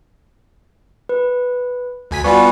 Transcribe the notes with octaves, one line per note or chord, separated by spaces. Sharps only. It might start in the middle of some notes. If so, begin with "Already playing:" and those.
B4
D2 G#5 B6
G3 B3 F4 F#4 G#5 C#6